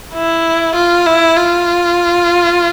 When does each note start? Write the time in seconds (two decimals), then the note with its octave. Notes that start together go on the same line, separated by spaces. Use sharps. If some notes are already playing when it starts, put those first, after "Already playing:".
0.14 E4
0.75 F4
1.06 E4
1.37 F4